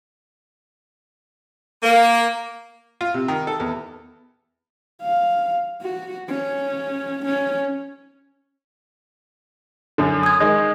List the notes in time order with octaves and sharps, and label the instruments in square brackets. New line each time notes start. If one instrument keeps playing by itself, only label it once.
[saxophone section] A#3
[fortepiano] F4
C3
D#3
A4
E2
[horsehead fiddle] F5
F#4
C#4
C#4
[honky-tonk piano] F#2 D3
[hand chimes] D#6 G#6
[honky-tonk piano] D#3 G#3